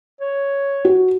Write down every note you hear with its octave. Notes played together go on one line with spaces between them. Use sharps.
C#5
F#4